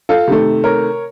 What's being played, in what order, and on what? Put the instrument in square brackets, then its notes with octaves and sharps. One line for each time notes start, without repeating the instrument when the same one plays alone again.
[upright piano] F4 A4
C3 D#3 A3
A#4 C#5